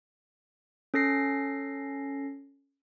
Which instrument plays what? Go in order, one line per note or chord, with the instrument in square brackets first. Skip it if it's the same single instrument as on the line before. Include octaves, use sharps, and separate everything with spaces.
[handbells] C#4 A4 A#6 C7